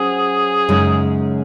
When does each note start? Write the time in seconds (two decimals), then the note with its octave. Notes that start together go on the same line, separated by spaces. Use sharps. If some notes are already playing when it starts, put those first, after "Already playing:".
Already playing: F#3 C#4 G#4 C5
0.69 F#2 C#3 G#3 D#4